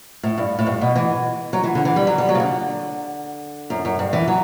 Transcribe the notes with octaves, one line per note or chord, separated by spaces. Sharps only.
A2
G2
A2
G2
B2
E3
F#3
E3
D3
E3
G3
F#3
G3
F#3
C#3
D3
F#2
F#2
G2
E3
F#3